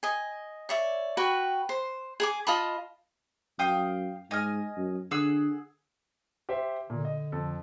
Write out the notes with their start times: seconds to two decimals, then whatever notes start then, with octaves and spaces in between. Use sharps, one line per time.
0.03 D#5 G#5
0.69 C#5 D5 E5
1.17 F#4 B4 G5 C#6
1.69 C5
2.20 G#4 G#5 D6
2.47 F4 D#5 A5 B5
3.59 F#2 F5 G5 D#6
4.31 G#2 D#5 G#5 F6
4.77 F#2
5.11 D3 G#4 F#5 E6
6.49 G4 C5 E5
6.90 A#2 D3
7.05 D#5
7.32 F2 A4